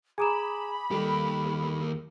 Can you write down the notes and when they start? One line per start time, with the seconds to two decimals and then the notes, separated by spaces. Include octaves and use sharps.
0.18 G#4 G#5 A#5 B5 D6 D#6 E7
0.91 D#2 G3 G4 A4